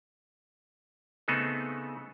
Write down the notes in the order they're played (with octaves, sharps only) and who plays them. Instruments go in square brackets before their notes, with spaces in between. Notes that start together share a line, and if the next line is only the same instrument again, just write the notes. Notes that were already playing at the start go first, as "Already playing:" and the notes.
[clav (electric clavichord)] C#3 A3 B3 C4 D#4 A4